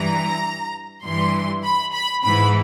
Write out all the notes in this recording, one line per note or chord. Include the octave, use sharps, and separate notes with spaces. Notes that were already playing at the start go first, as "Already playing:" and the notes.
Already playing: G2 E3 A#5
G2 E3 C6
B5
B5
G#2 E3 B5